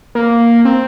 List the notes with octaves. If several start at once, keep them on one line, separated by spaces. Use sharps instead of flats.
A#3
C4